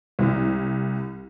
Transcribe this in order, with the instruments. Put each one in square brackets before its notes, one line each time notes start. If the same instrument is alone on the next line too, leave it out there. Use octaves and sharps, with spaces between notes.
[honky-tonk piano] C2